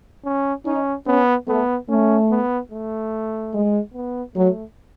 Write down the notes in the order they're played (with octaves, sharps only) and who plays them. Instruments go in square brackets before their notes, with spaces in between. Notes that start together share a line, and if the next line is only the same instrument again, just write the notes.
[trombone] C#4
[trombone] C#4 [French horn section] D#4
[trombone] B3 [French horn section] C#4
[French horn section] A3 [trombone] B3
[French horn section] A3 [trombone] C#4
[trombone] B3
A3
[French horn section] G#3
[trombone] B3
[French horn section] F#3 [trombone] A3